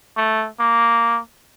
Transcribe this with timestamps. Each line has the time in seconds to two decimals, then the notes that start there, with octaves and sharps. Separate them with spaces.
0.17 A3
0.60 A#3